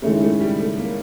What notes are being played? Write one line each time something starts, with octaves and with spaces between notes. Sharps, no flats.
D#3 G#3 A3 C#4 E4
A3
G3
A3
A#3